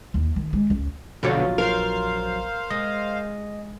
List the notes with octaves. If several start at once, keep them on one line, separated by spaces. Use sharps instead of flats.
D#2
D#3
G#3
C#2
A#1 B2 D3 F#3 F4 G4 C#5 A6
A#4 C5 F5
G#3 D#5